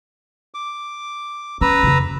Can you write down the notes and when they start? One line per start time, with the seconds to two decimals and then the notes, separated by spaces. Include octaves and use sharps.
0.54 D6
1.61 C#4 B4 A#5 E6
1.83 F2 C#3